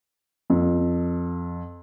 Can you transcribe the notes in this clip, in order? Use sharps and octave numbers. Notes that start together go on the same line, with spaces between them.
F2